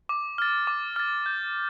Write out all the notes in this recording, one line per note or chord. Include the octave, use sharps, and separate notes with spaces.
D6
F6 A6
D6
F6 A6
G6